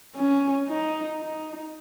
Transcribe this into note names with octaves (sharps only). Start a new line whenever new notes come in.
C#4
D#4
D#4